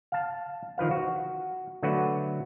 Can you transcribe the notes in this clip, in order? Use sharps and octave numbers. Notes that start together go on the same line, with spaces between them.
F5 A5
D#3 F3 B4 F5
F#4
D3 F#3 A3 F#4 B4